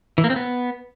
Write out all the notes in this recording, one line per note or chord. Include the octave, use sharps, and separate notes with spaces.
E3
A#3
C4
B3